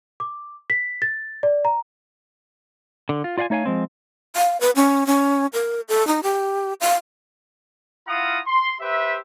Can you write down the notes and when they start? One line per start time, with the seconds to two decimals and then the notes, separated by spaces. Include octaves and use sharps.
0.20 D6
0.70 B6
1.02 A6
1.43 D5
1.65 A#5
3.09 D3
3.24 F4
3.38 F4 D5 F5 F#5 G#5
3.50 A3 D#4 C#5 F5 G#5
3.66 F3 G#3 C4
4.36 F5
4.61 B4
4.76 C#4
5.07 C#4
5.53 A#4
5.89 A4
6.07 D#4
6.23 G4
6.81 F5
8.08 E4 F4 F5 F#5 A#5 D#6
8.45 C6
8.80 G4 B4 C5 E5